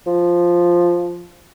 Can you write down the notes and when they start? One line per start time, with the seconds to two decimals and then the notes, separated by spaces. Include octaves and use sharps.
0.07 F3